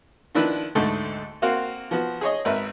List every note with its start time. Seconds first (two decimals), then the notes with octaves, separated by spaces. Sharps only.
0.35 D#3 F3 D4 E4 B4
0.75 D2 G#2 D3 A3
1.42 A#3 C4 F#4 F5
1.91 F3 B3 F#4
2.21 G#4 C#5 D#5
2.45 G#1 A#4 B4 E5